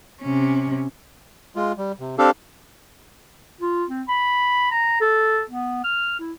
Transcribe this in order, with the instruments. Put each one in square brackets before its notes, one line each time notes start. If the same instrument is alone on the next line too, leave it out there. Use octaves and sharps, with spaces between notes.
[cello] C3 C#4
[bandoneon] G#3 F4
G3
C3
C4 D4 G4 A4 F5
[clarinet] F4
C4
B5
A#5
A4
B3
F6
E4